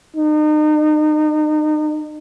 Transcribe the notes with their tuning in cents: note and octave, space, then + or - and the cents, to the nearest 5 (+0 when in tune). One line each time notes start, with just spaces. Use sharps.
D#4 -35